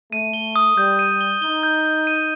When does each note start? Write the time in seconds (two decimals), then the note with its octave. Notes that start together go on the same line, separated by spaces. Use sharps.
0.12 A3 D#7
0.33 G7
0.56 D#6
0.77 G3 G6
0.99 D#7
1.21 G7
1.42 D#4 G7
1.63 G6
1.85 G6
2.07 D#7